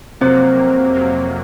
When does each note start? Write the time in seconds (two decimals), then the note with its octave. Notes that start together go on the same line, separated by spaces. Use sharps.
0.21 F2 C3 F#3 A#3 C4 C5
0.94 F2 C3 F#3 A#3